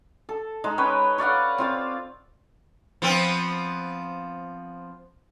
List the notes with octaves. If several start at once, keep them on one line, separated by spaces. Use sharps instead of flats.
A4
G#3 D#4
C#4 B4 C#5 G5
C#5 D5 F5 F#5
C4 F4 F5
F3 B3 C4